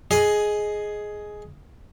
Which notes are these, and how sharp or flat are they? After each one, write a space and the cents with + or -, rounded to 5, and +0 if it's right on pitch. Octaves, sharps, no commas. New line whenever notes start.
G#4 +10 D#5 +0